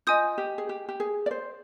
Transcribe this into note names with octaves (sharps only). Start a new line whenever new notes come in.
F4 D#5 G#5 D#6 G6
G4
G#4
G4
G4
G#4
D5
C5